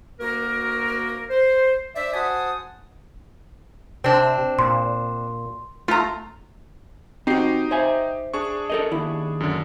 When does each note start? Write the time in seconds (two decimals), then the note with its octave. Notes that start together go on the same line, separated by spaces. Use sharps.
0.20 D2 A#3 F#4 A#4
1.30 C5
1.95 D4 C5 D5 E5
2.14 F#4 C5 F#5 G#5 A5 D#6
4.04 C3 C4 D4
4.59 A#2 C6
5.88 A3 F4 A#5
7.27 C4 D#4 F#4 G4 C7
7.71 C5 E5 G#5
8.34 D4 G#4 C#6
8.70 A4 A#4 D#5
8.91 D#2 E4
9.40 F#2 D3